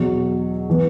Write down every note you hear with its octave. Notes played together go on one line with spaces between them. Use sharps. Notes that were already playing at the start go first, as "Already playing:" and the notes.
Already playing: E2 B2 F#3
E3 B3